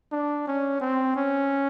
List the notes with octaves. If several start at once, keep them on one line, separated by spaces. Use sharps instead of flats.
D4
C#4
C4
C#4